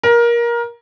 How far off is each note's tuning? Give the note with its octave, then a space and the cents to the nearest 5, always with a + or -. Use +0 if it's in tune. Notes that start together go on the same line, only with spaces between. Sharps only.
A#4 +20